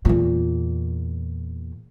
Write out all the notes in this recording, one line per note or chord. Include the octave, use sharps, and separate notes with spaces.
E2 A#2